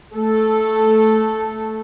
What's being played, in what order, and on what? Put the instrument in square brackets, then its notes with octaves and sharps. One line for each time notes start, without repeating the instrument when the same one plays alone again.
[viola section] A3 A4